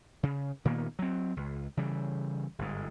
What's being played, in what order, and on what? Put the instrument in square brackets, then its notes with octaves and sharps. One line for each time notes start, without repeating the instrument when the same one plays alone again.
[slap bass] C#3
A#2 D#3 A#3 B3
F#3 C4
C#2
C#3 E3 G3
G1 G#2